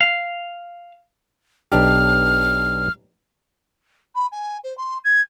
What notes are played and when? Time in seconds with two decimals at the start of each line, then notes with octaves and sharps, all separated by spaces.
0.01 F5
1.72 B1 D4 G4 F6
4.15 B5
4.32 G#5
4.64 C5
4.78 C6
5.04 G#6